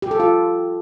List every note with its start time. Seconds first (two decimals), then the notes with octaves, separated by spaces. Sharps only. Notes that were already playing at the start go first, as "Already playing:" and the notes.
0.02 G4
0.11 A4
0.20 F4